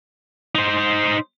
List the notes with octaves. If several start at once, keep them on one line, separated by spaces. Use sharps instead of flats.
D#4 C5